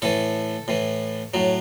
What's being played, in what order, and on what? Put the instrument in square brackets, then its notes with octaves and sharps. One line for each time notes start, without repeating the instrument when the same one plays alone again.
[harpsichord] A2 E3 A4
A2 E3
A2 F#3